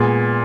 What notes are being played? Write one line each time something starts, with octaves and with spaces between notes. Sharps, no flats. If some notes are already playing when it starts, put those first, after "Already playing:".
Already playing: A#2 G#3 B3 G#4